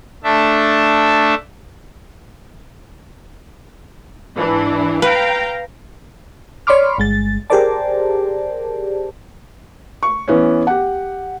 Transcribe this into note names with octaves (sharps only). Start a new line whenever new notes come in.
A3 D4 E5
G#2 E3 D4
B4 F5 G5 A#5
C#5 D5 B5 C6 D6 F6
G1 G#3 A6
G4 G#4 A#4 C5 D5 A5
C#6
E3 B3 C#4
G4 F#5